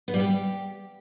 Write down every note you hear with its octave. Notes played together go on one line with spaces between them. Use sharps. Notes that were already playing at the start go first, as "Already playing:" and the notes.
B3
G3
G4